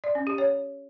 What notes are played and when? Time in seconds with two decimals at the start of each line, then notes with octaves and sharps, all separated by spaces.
0.04 D5
0.15 C#4
0.27 G4
0.38 C#5